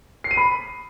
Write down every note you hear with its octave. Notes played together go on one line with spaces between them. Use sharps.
C7
D#7
B5